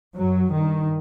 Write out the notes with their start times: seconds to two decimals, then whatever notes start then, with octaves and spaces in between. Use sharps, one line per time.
0.17 F#2 F#3
0.53 G2 D#3